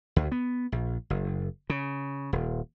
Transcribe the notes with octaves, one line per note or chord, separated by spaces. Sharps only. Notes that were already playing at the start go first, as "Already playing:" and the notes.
D2
B3
A#1
F#1
C#3
D#1